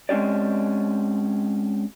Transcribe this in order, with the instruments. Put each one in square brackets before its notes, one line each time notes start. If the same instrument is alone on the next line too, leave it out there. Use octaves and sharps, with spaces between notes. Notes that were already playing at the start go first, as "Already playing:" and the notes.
[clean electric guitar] G#3 C4 C#4 G4 D5